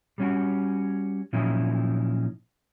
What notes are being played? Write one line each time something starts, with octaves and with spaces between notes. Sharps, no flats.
G3 C#4 F#4
A#2 F3 F#3 C#4 D#4 E4